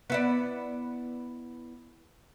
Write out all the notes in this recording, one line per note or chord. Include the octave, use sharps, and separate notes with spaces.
B3 E4 D5